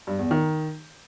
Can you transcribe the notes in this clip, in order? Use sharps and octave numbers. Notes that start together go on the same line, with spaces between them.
G2
E2
D#3